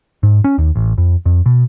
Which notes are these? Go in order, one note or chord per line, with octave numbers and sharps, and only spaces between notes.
G#2
C#4
D#2
A1
F2
F2
B2